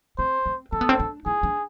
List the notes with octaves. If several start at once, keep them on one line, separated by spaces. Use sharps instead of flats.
C4 C5
C4
C4 A4
B3
C4
D4
E4 G#4
D4